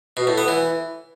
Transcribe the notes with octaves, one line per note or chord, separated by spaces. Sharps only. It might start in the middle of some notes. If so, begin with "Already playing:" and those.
B2
A2
B3
E3